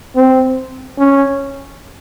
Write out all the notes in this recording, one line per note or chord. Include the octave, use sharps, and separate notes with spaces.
C4
C#4